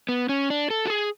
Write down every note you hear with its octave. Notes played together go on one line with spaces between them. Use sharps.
B3
C#4
D4
A4
F#4
G#4